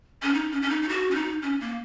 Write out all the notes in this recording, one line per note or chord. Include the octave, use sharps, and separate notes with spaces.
C#4
D#4
C#4
C#4
D#4
D#4
F#4
C#4
D#4
C#4
A#3